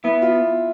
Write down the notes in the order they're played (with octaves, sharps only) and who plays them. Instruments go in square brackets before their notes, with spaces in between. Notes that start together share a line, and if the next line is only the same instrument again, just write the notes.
[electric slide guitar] B3 [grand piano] E4
[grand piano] F4